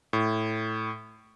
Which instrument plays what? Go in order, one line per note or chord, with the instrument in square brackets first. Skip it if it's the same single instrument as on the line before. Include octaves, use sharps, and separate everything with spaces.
[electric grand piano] A2